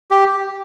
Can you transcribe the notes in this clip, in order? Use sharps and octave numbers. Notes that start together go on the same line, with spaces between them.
G4